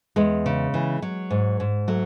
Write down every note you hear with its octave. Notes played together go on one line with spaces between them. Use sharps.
E2 G#3
C#3
E3
F#3
G#2
G#2
F#3 A3